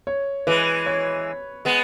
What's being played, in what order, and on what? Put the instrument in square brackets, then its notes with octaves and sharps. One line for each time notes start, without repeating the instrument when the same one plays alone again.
[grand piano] C#5
[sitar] E3 G#3 [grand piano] B4
[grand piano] C#5
[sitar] G#3 B3